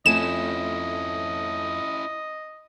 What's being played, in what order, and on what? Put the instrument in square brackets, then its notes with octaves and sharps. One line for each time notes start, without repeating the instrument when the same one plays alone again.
[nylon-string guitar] F2 A3 G#5 [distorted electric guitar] C#4 E4 [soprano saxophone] D#5 [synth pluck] E7